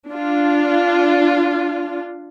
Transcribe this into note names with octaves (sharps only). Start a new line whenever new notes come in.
D4 F4